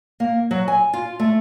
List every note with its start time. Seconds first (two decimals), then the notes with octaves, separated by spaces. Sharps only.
0.20 A#3
0.51 F#3
0.68 G#5
0.93 F4
1.20 A3